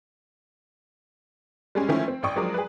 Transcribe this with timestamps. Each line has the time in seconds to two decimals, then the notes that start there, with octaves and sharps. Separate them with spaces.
1.75 G3 G#3 C#4
1.89 D#3 F3 A3 C#4 E4
2.08 C4
2.23 A1 D5 G5 C#6 D#6
2.36 F3 F#3 G#3 D4 A#4 D5
2.54 G#4 B4